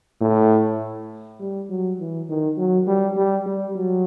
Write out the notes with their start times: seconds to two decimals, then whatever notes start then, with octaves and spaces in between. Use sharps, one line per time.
0.21 A2
1.40 G3
1.70 F#3
2.00 E3
2.29 D#3
2.58 F#3
2.87 G3
3.17 G3
3.46 G3
3.76 F#3